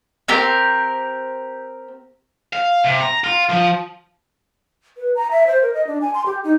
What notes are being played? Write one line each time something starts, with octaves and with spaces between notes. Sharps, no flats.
C4 G4 A#4
F5
C3
A#5
F4
F3
B4
A#5
E5
C5
A#4
D#5
D4
G#5
C6
G4
D#4